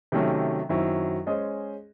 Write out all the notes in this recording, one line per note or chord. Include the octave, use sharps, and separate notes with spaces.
C3 D#3 F#3 A3 C#4
F#2 D#3 F#3 C4 E4
G#3 C#4 G#4 C5 D#5